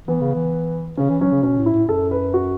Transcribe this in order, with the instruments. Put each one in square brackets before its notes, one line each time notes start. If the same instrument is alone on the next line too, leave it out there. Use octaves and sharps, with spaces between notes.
[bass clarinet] E3 [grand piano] B3
[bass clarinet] C#3
E3
[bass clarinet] C#3 [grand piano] C#4
[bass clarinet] E3
[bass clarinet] F#3 [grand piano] C#4
[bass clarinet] C#3
[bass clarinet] B2 [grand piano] C#4
[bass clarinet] A2
[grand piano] E4
[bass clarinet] A2
[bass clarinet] F#2 [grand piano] A4
[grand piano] B4
F#4